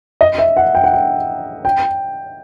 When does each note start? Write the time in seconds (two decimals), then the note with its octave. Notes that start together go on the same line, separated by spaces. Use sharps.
0.21 D#5
0.38 E5
0.57 F#5
0.75 G5
0.84 F#5
0.93 G5
1.65 G5